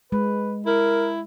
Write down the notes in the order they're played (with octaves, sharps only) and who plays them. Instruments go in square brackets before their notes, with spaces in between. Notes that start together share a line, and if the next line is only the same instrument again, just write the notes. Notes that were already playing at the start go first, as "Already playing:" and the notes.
[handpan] G#3 [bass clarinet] B4
[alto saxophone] E4 [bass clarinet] A#4